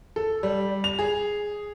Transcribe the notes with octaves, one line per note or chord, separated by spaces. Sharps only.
A4
G3
F7
G#4